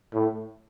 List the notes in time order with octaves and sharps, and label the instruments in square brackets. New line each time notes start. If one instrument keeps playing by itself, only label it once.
[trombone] A2